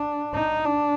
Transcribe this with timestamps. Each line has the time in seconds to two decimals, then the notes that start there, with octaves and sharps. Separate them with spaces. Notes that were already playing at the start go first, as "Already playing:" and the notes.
Already playing: D4
0.34 D#4
0.65 D4